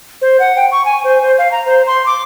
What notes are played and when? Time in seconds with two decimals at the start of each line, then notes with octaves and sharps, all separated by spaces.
0.22 C5
0.40 F#5
0.56 G5
0.72 C#6
0.85 G#5
1.04 C5
1.22 C5
1.38 F5
1.52 A#5
1.66 C5
1.87 C6
2.06 D6